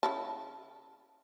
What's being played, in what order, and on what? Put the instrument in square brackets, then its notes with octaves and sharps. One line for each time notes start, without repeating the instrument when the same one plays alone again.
[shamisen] C#3 E4 A5